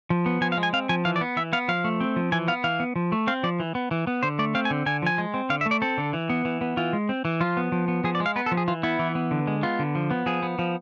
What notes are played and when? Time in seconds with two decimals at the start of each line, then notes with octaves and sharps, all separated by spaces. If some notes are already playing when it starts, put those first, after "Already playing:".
0.10 F3
0.26 B3
0.41 F3 G#5
0.52 F5
0.57 G#3
0.63 G#5
0.73 C4 F5
0.89 F3 G#5
1.05 E3 F5
1.16 D5
1.21 B3
1.37 E3 E5
1.53 B3 F5
1.68 F3 F5
1.84 A3
2.00 C4
2.16 F3
2.32 E3 G#5
2.48 B3 F5
2.64 E3 F5
2.80 B3
2.96 F3
3.12 A3
3.27 C4 F5
3.43 F3 D5
3.60 E3
3.75 B3
3.91 E3
4.07 B3
4.23 D3 C5
4.39 A3 D5
4.55 C4 F5
4.65 G#5
4.70 D3
4.86 D3 G#5
5.02 F3 G#5
5.18 G#3
5.34 C4
5.50 D3 F5
5.61 E5
5.66 A3
5.71 D5
5.82 C4 A4
5.98 D3
6.13 E3
6.29 B3
6.45 E3
6.61 B3
6.77 E3 F4
6.93 G#3
7.09 C4
7.25 E3
7.41 F3 F4
7.57 B3
7.72 F3
7.88 B3
8.04 F3 G#4
8.15 D5
8.20 G#3
8.26 F5
8.36 B3 B4
8.46 A4
8.52 F3
8.57 G#4
8.68 E3 F4
8.83 B3 E4
8.99 E3
9.15 B3
9.31 D3
9.47 G#3
9.63 B3 F4
9.79 D3
9.95 F3
10.11 B3
10.26 F3 G#4
10.43 B3
10.59 F3